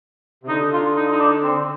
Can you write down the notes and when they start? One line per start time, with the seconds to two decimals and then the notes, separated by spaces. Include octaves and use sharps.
0.43 C3
0.48 D3 D#4
0.73 F4
0.96 D#4
1.11 D#4
1.20 D4
1.44 C4